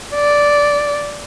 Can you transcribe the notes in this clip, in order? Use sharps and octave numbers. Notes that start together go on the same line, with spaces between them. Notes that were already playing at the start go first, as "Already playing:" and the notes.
D5